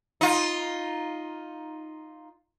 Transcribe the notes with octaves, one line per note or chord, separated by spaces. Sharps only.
D#4 F4